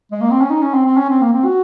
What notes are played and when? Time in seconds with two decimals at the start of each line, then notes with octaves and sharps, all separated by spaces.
0.11 G#3
0.21 A#3
0.31 C4
0.41 C#4
0.50 D#4
0.62 C#4
0.74 C4
0.85 C4
0.97 C#4
1.09 C4
1.21 A#3
1.33 C4
1.45 F#4